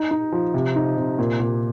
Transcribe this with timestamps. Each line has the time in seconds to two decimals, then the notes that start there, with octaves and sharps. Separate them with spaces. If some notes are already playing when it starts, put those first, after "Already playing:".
Already playing: D#4
0.11 D#4
0.32 F3
0.54 C3
0.76 D#4
0.97 C3
1.19 A#2
1.40 A#2